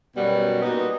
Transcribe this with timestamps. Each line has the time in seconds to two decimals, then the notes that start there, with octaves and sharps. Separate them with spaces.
0.15 F#2 B2 G3 B3
0.62 A#2 B3 D#4 F#4